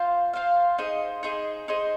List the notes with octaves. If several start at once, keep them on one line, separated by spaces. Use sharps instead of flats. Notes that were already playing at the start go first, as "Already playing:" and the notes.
Already playing: F4 C5 F5
F4 C5 F5
D#4 G#4 C5 D#5
D#4 G#4 C5 D#5
D#4 G#4 C5 D#5